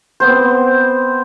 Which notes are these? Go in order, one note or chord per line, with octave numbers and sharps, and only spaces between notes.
B3 C4 C5